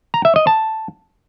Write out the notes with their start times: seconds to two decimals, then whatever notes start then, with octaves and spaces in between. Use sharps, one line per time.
0.14 A#5
0.25 E5
0.36 D#5
0.47 A5